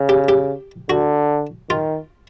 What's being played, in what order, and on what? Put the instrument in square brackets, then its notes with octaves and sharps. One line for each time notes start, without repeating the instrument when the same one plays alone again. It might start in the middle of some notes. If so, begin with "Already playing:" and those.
Already playing: [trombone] C#3
[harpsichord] G4
G4
[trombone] D3 [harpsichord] F#4
[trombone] D#3 [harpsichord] F4